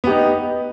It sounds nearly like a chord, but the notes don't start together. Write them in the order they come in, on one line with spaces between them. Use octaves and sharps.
B3 G4 D#4